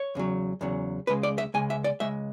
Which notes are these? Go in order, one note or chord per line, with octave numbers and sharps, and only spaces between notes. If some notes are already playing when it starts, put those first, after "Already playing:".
Already playing: C#5
E2 C#3 F#3
E2 C#3 F#3
C#2 C#3 G#3 B4
D5
E5
C#2 C#3 G#3 G#5
E5
D5
C#2 C#3 G#3 E5